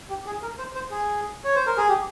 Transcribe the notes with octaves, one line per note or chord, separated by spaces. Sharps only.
G4
G#4
A#4
C5
C5
G#4
C#5
C5
A#4
G#4
G4